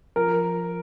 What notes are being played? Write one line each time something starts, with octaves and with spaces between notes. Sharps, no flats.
F3 A#4